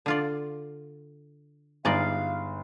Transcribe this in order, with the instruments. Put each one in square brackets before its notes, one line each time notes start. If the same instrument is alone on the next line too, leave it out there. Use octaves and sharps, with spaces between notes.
[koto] D3 F4 D5
[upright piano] G1 [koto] G#3 D#4 D5 [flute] F5